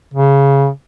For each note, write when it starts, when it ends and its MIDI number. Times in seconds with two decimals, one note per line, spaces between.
0.14 0.69 49